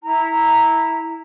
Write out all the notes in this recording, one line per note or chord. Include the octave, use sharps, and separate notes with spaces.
E4 A#5